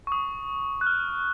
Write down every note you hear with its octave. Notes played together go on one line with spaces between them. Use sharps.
C#6
D#6
F#6
F6